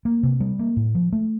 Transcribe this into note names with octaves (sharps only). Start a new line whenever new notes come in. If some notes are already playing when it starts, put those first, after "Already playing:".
A#3
C3
G3
A#3
A2
F3
A3